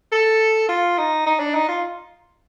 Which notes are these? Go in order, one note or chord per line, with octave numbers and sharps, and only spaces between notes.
A4
F4
D#4
D#4
D4
D#4
F4